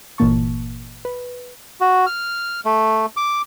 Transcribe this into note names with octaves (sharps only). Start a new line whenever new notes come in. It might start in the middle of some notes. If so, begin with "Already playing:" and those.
G1 A#2 E3 A#3 A5 C#6
B4
F#4
F6
A3
D6